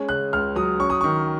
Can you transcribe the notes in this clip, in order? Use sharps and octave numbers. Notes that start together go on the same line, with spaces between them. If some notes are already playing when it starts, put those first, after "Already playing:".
Already playing: G#3 C#4
C#3 F#6
C#2 F6
F#3 D#6
C#4 C#6
D#6
D#3 C#6